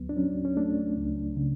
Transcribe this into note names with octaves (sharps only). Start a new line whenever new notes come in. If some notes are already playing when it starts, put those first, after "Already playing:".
Already playing: D2 F#3 B3
D4
F#3 C#4
C#4
A3 D4
C#2
C#3